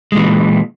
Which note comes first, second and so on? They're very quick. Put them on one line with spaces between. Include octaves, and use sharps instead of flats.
G#3 A#2 E3